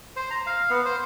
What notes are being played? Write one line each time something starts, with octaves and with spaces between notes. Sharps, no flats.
C5
A#5
F5
B3
C5